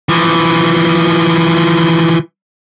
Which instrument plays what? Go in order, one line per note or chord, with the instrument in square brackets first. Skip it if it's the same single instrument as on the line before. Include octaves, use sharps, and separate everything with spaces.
[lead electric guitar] E3 F3